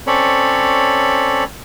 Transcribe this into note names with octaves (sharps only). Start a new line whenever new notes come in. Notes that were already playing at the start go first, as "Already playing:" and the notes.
C4 C#4 A4 C#5 D5 B5